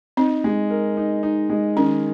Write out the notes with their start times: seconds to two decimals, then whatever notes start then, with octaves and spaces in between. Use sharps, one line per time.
0.17 C4 D#4
0.44 G#3
0.70 A#4
0.97 D#4
1.23 D#4
1.50 G#3
1.77 D#3 C#4